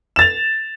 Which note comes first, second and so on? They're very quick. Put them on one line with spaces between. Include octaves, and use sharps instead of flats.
E7 A6 F7